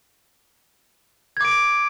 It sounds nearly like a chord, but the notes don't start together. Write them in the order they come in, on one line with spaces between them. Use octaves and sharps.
G#6 D6 D7